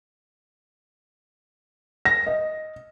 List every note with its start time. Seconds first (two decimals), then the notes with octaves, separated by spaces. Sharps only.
2.05 A#6
2.26 D#5